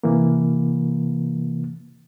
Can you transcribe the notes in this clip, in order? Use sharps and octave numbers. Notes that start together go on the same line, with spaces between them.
C3 E3 A#3